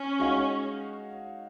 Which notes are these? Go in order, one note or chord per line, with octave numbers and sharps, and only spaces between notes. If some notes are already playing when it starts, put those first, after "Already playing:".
Already playing: C#4
G#3 D#4 F#4 C#5 F5